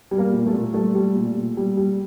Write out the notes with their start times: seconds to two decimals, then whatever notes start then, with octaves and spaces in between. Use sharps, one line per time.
0.11 G3
0.18 A#3 A#4
0.32 A#2
0.46 A3 A4
0.53 A#2
0.74 G3 A3 A4
0.95 G3
1.15 A#2
1.36 A#2
1.57 G3
1.77 G3